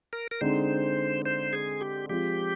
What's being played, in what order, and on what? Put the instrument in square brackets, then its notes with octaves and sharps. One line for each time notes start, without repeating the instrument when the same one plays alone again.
[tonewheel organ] A#4
A#4
[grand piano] D3 G#3 C4 D#4 [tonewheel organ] C5
[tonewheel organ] C5
G#4
G4
[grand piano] F3 G#3 C4 F4 [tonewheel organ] G4